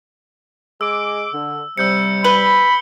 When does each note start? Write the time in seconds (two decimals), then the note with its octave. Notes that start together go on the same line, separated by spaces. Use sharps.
0.81 G#3 D6 E6
1.33 D3
1.78 C3 G3 E6 G6 C#7
2.24 B4 B5 F#7 G7